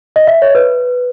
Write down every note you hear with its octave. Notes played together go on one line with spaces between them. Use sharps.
D#5
E5
C#5
B4